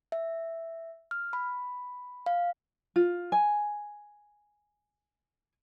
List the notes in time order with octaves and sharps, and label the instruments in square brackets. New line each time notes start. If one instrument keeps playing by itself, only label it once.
[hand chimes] E5
F6
B5
F5
[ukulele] F4
G#5